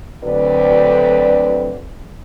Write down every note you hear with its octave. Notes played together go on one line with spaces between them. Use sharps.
D2 D3 F#3 C4 B4 D5